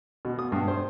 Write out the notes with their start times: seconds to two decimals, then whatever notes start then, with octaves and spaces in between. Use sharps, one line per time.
0.25 B2
0.39 D#6
0.52 G2
0.68 C5